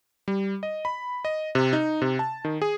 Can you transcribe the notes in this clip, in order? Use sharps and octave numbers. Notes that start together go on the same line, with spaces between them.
G3
D#5
B5
D#5
C3
D#4
C3
A5
D#3
G#4